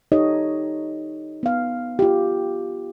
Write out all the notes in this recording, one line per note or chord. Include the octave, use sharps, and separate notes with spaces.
D#4 G4 A4 C#5 D#5
B3 F5
F4 G4